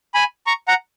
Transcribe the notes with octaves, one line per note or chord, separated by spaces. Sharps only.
G#5 B5
A#5 C#6
F#5 A#5